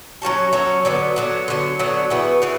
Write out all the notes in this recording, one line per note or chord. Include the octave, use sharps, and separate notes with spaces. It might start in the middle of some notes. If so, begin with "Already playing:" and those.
F#3 C#4 F#4 A4
F#3 C#4 F#4 A4
D3 F#3 B3
D3 F#3 B3
D3 F#3 B3
D3 F#3 B3
C#3 E3 B3 F#4
C#3 E3 B3